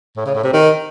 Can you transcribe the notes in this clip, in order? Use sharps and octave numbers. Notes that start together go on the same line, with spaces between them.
A2
C#3
A2
C3
D#3